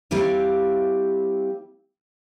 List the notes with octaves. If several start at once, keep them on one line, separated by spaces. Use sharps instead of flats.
G3 C4 E4 G4 F5